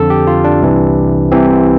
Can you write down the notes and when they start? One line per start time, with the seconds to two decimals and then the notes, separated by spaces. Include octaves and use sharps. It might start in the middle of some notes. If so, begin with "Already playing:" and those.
Already playing: F2 D3 A4
0.10 G4
0.27 F4
0.44 D4
0.62 C2 C3 E3
1.31 C2 C3 E3 C4